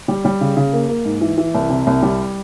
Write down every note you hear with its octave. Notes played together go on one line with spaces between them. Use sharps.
G3
G3
C#3
C#3
A#3
A#3
G#2
E3
E3
C2
C3
C2
G3